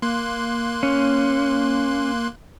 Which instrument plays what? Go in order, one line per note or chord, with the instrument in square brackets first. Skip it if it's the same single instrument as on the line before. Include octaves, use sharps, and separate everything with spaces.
[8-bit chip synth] A#3 C6 F#6
[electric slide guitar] C#4